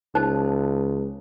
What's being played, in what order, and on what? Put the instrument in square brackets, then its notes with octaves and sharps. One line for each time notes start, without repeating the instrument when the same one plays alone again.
[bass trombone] C#2 [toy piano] D#4 C5 A5